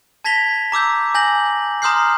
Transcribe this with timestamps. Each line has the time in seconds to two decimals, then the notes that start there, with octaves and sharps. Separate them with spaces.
0.24 A5 G#6 A#6 B6 F7 G7
0.72 A#5 D6 E6 G6
1.15 G#5 G6 A#6 F#7
1.82 A#5 C6 D#6 F6 G6 C7